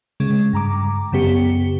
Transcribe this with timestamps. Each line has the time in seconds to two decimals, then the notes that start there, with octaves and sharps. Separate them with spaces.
0.20 C#3 G#3
0.53 G2 A#5 D6
1.12 F#2 C#3 B3 G4 C#7